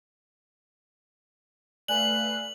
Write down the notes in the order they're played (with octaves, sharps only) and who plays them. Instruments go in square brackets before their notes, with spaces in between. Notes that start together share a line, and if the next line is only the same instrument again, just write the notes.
[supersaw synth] A3 B4 F5 [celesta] D5 G#5 [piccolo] F#6 [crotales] F#7